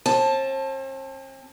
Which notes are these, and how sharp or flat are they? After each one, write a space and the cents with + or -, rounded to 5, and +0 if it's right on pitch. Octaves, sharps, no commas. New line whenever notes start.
C4 +45 A5 +0